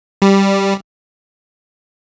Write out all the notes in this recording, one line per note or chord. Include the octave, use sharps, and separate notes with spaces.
G3